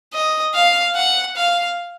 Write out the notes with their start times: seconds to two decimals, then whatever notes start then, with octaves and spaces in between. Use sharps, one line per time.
0.13 D#5
0.55 F5
0.96 F#5
1.37 F5